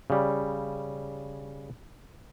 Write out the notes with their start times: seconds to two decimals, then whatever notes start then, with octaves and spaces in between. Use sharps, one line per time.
0.10 C#3 G3